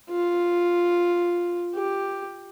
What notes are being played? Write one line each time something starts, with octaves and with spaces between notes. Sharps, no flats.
F4
G4